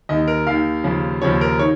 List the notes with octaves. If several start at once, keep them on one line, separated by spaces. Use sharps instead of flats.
D#2 D#3 D#5
A#4
D#2 D#3 F5
D#2 C#3 F3
D#2 C#3 F3 C#5
A#4
D#3 C#5